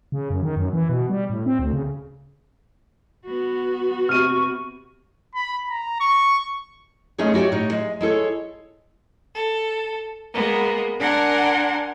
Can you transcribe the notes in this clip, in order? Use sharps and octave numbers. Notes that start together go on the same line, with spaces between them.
C#3
F#2
D#3
F#2
E3
B2
G3
A2
C4
D2
C#3
B3 F#4
C3 C#6 F6 D#7
B5
A#5
C#6
G#3 A3 C#4 D#4 G#4 C#5
E4 F#4 G4 C#5 D5
A2 D#4 C#5
G#3
G#3 E4 A4 C#5
A4
G#3 A#3 B3
D4 A#4 F#5 G#5 A5 C6